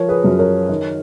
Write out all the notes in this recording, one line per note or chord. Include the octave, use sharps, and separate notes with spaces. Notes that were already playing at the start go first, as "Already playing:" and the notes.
Already playing: F3 A#4 C#5
G#4 B4
F#2
A#4 C#5
D#3